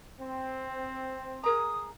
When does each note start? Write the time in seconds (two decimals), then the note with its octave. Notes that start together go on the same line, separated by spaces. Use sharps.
0.18 C4
1.44 G#4 A#4 A#5 D#6